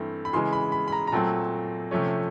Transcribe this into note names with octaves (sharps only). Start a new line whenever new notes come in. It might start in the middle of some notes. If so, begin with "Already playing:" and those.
Already playing: G2 E3 A3 C4
B5
C#3 E3 G#3 C6
B5
B5
B5
A#5
A#5
A#2 F#3 A3 C4 A5
C3 F3 A3 C#4